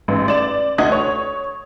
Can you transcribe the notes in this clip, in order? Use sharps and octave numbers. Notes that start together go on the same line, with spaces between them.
A1 G#2
D5 E7
D2 D4 D#5 F#5 D#6 G#6
C#5